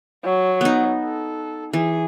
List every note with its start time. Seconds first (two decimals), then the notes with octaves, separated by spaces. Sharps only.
0.25 F#3
0.61 B3 D#4
1.04 A4
1.73 E3 G#4